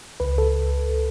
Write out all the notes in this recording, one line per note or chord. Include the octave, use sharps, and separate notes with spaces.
C#2 B4
A4